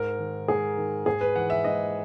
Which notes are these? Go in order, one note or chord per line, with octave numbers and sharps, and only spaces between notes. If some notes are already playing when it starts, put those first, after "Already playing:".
Already playing: G#2 A#4
D#3
G#2 G#4
D#3
G#2 G#4
B4
E3 F#5
E5
G#2 D#5